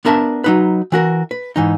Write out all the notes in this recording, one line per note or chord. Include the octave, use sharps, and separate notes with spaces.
B3 D4 A#4 E5 A5
F#3 D#4 B4
E3 F#4 A#4
B4
G#2 E3 D#4